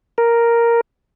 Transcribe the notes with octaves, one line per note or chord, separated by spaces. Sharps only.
A#4